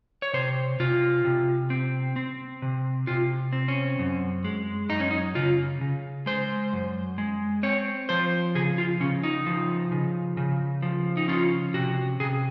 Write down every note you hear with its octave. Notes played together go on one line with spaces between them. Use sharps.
C#5
C3 C5
C3 F4
C3
C4
C4
C3
C3 F4
C4
C#4
F#2
G#3
F#2 D#4
C#4
D#4
C#3 F4
C#3
G#3 C5
F#2
G#3
C4 C#5
F3 C5
C#3 G#4
F4
C#3 C#4
D#4
F3
C#3
C#3
F3
D#4
C#4 F4
C3 F#4
C3 G#4